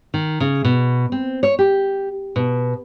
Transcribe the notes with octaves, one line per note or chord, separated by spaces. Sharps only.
D#3
C#3
B2
C4
C#5
G4
B2